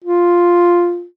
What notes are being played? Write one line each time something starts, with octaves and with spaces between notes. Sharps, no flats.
F4